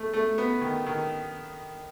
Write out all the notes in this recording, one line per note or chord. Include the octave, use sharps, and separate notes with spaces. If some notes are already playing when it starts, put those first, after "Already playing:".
Already playing: A3
A3
B3
D#3
D#3